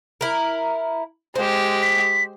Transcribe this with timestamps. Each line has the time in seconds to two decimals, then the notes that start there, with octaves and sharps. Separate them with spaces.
0.21 E4 A#4
1.36 G#3 G4 C5
1.82 B6